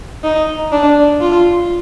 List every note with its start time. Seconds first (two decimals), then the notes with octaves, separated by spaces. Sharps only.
0.24 D#4
0.72 D4
1.21 F4